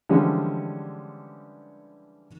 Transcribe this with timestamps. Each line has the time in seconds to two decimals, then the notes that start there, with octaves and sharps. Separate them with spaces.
0.09 D3 E3 F3 G3 G#3 C#4